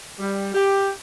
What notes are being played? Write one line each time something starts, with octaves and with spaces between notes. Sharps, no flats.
G3
G4